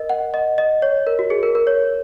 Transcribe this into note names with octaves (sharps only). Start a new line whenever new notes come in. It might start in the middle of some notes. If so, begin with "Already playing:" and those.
Already playing: A#4 D#5
F#5
D#5
D#5
C#5
A#4
F#4
G#4
A#4
A#4
C#5